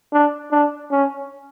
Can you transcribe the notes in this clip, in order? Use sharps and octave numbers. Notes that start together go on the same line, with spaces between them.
D4
D4
C#4